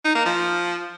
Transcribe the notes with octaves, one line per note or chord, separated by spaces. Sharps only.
D#4
A#3
F3